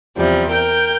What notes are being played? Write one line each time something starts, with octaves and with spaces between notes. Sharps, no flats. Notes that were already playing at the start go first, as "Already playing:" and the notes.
E2 C3 F3 G3
A#4 G5 G6